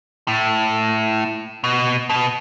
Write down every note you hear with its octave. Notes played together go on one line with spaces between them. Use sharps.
A2
B2
B2